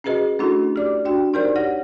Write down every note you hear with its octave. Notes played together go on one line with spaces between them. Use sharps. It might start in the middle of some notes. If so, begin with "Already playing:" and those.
C#4 F#4 G#4 B4 D#5
A3 C#4 D4 E4 F#4 A4
G4 D5 D6
D4 F#4 G5
D#4 G4 A#4 C5 D5
G4 C#5 F#5 A#6